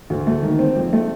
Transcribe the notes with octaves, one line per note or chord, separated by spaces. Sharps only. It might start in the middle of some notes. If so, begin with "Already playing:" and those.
D2
A3
D#3
C4
F2
A3